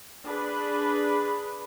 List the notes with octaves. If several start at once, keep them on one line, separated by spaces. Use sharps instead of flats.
D4 G#4 B4